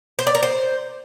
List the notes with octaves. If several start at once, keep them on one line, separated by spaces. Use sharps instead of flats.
C5
D5
A#4
C5